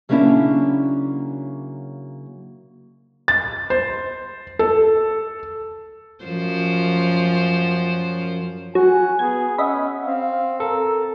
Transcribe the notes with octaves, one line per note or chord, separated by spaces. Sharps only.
C#3 F#3 A#3 C#4 D4 E4
A6
C5
A4
F#2 F3 C5
F#3 F#5 G#5
B3 G#4 G#6
C#4 D#5 E5 F#5 B5
C4 F5
A4 A#4